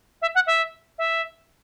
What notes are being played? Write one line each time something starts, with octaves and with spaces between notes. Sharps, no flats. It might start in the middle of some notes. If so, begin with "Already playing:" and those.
E5
F#5
E5
E5